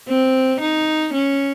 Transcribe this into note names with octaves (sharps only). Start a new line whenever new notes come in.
C4
D#4
C#4